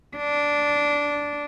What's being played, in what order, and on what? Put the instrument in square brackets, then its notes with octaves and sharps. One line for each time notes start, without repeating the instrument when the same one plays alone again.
[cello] D4